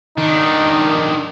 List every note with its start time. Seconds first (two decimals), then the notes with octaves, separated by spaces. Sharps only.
0.18 D#3 D4 D#4